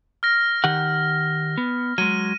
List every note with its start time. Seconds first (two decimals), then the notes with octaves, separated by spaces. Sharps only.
0.23 F6 A#6
0.64 D#3 G4 F#5
1.57 B3
1.98 F#3 G#3 D#7